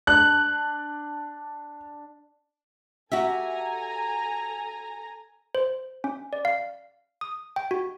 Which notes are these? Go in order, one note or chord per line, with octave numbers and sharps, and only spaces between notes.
D4 F#6
F#4 G4 A4 E5 G#5 A#5
C5
C#4
D5
F5
D#6
G5
F#4